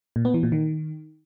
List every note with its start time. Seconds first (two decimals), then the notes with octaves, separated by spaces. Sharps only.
0.16 A#2
0.25 B3
0.34 E3
0.43 A#2
0.52 D#3